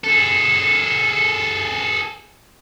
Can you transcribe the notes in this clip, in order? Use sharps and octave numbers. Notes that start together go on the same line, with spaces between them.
G#4 A4